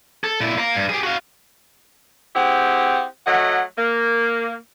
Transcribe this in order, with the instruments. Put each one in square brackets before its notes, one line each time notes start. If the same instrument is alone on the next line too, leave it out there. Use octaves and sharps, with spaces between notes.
[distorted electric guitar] A4
A#2 E4
F5 A#5
G2
G4 G#4
F#4 F5
[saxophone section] C4 E4 G4 G#4 F#5
F#3 A3 D#5 F#5
A#3